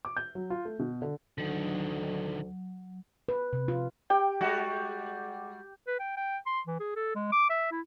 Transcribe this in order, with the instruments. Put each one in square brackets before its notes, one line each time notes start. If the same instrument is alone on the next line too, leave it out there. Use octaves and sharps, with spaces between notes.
[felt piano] D6
G6
F#3
F4
A3
B2
D3
[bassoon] D2 [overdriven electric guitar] D3 D#3 [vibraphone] F#3
[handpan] B4
C3
F4
[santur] G4 [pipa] G5
[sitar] G3 G#3 F#4
[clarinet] B4
G5
G5
C6
E3
G#4
A4
G#3
D6
E5
E4